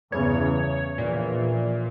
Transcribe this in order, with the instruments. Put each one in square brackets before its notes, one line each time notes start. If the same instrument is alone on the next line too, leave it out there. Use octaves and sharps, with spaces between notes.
[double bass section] E2 G2 C#3 [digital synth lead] C#5
[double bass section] A#1 E3 [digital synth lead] A#2